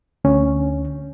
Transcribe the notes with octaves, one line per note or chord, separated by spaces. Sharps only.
D2 C#4